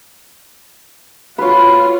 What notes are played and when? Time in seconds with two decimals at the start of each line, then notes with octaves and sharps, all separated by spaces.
1.38 F4 F#4 B4 C#5